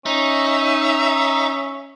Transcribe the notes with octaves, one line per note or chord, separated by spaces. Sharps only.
C#4 D#4 E5